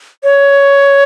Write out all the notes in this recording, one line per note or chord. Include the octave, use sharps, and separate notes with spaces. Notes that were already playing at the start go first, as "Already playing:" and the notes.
C#5